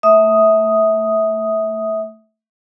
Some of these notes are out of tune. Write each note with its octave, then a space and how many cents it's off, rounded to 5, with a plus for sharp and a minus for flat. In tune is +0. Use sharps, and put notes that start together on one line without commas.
A3 +15 E5 -25 D#6 +0